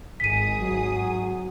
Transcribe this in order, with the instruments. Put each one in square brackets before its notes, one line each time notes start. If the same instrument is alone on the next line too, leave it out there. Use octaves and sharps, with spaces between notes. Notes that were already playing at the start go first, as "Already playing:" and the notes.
[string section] G#1 G#4 D#6 [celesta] B6 D#7
[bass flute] F#3